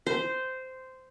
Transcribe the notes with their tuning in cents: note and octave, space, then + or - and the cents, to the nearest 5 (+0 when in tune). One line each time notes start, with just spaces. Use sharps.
C5 -10